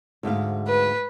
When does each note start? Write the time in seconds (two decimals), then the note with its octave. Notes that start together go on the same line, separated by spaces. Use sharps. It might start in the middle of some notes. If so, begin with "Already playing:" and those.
0.23 D2 G#2 F5
0.68 B4